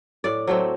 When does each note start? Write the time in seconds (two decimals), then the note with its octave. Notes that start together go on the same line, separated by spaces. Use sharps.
0.24 A2 D5
0.48 F#3 A3 C4